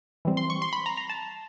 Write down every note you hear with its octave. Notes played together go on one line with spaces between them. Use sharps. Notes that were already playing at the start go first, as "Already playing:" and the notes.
E3 G3 C4
C6
C#6
C6
B5
A#5
A#5
A5